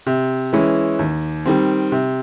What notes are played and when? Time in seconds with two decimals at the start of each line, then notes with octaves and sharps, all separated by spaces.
0.07 C3
0.53 E3 G#3 C#4 E4
0.99 D#2
1.46 D#3 G3 C4
1.92 C3